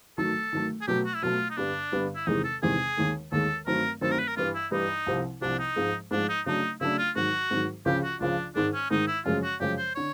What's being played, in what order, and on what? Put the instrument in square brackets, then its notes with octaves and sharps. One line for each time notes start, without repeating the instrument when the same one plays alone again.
[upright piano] D#3 F#3 A3 [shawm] A4
[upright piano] D#3 F#3 A3
[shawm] G#4
[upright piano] B2 F#3 A3 [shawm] G4
[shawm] F#4
E4
[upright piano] B2 F#3 A3 [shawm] F4
[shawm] D#4
[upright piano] G2 D3 G3 B3 [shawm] D4
[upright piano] G2 D3 G3 B3
[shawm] E4
[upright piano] E2 C3 D#3 G#3 [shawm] D#4
[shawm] A4
[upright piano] E2 C3 D#3 G#3 [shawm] G#4
[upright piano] D#2 D#3 G#3
[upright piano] D#2 D#3 G#3 [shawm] A4
[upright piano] G2 D#3 F#3 A3 C4 [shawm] A#4
[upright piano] G2 D#3 F#3 A3 C4 [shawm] A4
[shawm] A#4
B4
A#4
[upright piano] G2 E3 G3 [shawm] F4
[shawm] E4
[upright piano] G2 E3 G3 [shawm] D#4
[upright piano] C2 C3 F3
[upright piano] C2 C3 F3 [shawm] D4
[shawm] D#4
[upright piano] G#2 F3 G#3
[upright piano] G#2 F3 G#3 [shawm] D4
[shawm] D#4
[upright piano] C#3 F#3 A3 D4 [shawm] D#4
[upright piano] C#3 F#3 A3 D4 [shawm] E4
[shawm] F4
[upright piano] G#2 D#3 F#3 [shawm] F#4
[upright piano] G#2 D#3 F#3
[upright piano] C#2 C#3 F3 [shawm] G4
[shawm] F#4
[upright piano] C#2 C#3 F3 [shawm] D4
[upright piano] G#2 D#3 G#3 [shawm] D4
[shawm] C#4
[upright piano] G#2 D#3 G#3 [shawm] D#4
[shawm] E4
[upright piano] F#2 C#3 F3 G#3 [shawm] F4
[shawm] F#4
[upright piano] F#2 C#3 F3 G#3 [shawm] G4
[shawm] C5
[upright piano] D3 [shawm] C#5